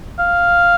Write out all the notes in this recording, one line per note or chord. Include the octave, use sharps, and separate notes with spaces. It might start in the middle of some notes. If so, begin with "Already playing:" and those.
F5